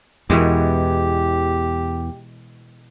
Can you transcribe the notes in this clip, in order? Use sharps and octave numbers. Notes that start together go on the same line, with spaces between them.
E2 B2 E3 G#3 G4